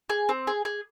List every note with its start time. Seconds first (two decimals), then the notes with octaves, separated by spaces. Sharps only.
0.10 G#4
0.29 C4
0.47 G#4
0.65 G#4